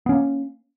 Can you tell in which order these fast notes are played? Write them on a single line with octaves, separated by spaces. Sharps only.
B3 C#4 A#3